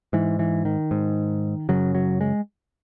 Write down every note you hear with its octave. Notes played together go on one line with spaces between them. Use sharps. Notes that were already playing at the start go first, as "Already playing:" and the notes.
G#2 E3
E3
D#3
G#2
F#2 C#3 F#3
F#3
G#3